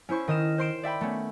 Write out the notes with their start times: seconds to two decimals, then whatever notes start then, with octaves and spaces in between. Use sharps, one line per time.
0.09 C#4 E4 C5 C#6
0.28 D#3 D#5 F6 E7
0.58 C5 C6 D7 E7
0.83 D5 E5 G5 B5
1.01 A3 B3 C#4